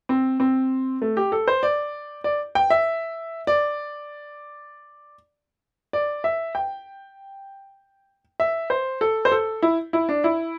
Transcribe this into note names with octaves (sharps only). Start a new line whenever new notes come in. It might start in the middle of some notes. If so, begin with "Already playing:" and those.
C4
C4
A3
G4
A4
C5
D5
D5
G5
E5
D5
D5
E5
G5
E5
C5
A4
C5
A4
E4
E4
D4
E4